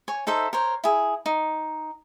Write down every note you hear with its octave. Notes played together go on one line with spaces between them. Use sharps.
C#5 G#5
D#4 A4 C5 E5
A#4 C5 C#5
E4 G#4
D#4